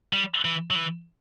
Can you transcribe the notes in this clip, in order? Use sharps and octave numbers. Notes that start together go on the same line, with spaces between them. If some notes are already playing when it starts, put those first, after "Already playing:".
G3
E3
F#3
E3